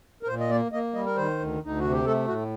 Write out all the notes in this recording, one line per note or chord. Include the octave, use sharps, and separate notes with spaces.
A#4
A#2 C5
D#5
A#3 D5
A#3 D#5
G3 D#5
A#4
D#3 C5
D2
D2
D#4
C3 F#4
G4
A3 A4
A2 F#4